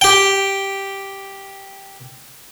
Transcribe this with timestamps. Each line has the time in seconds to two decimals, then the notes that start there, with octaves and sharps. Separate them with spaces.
0.01 G4 G5